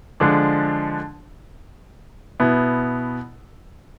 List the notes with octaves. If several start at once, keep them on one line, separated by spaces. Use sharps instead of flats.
D3 F3 G#3 D4
B2 B3 E4